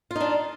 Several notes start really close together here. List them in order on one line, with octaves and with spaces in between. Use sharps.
F4 D#4 D4